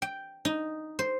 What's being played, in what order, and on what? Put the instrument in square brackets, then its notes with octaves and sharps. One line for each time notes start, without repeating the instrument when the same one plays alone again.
[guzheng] G5
D#4
C5